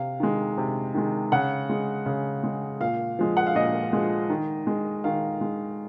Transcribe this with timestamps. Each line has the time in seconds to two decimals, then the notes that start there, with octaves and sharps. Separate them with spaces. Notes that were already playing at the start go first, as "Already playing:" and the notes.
Already playing: C3 F5
0.20 D#3 G#3
0.58 C3
0.94 D#3 G#3
1.32 C#3 F#5
1.69 G#3
2.06 C#3
2.44 G#3
2.80 A#2 F5
3.19 F3 G#3
3.37 F#5
3.47 F5
3.55 A#2 D#5
3.93 F3 G#3
4.30 D#3
4.67 G#3
5.04 D#3 F5
5.41 G#3